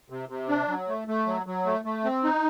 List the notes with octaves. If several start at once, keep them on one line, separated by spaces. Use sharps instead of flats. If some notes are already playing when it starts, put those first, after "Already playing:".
C3
C3
D4
F#3
A3
A3
F#3
F#3
A3
A3
C4
D#4